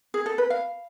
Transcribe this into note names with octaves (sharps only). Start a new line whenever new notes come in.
G#4
A4
B4
F5